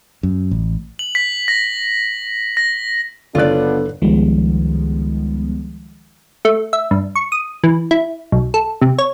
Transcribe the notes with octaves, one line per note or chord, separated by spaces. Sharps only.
F#2
A1
F#7
B6
A#6
A#6
F#1 D3 B3 D4 F4 C#5 D5 F#6
C#2 D#3 F3 G3 G#3 B3
A3
E5
G2
C#6
D#6
E3
E4
B1
A4
C3
C#5